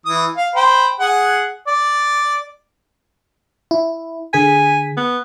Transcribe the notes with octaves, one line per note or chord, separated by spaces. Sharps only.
E3 D#6
F5
C5 G5 B5
G#4 F#5
D5
E4
D3 G#4 G#5 B6
B3